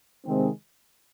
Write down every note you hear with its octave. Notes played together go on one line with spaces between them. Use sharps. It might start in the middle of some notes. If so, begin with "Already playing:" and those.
C3 D#3 G#3 C4